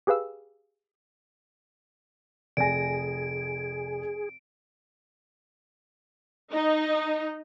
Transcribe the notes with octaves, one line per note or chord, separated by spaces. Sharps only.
G4 G#4 B4 F5 E6
F1 G#4 D5 G#5 A#6 D7
D#4